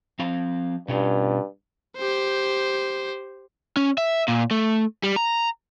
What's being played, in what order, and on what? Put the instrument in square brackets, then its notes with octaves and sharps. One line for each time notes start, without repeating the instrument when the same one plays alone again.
[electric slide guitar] F3 C4 F5
[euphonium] G2 [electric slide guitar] B2 C#4 F4
[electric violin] G4 C5
[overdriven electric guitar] C#4
E5
A#2
A3
G3
A#5